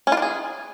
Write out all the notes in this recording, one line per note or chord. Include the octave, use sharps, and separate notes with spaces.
C#4
F4
D4
G#4